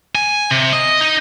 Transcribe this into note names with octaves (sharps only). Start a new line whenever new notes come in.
G#5
C3
D#5
D#4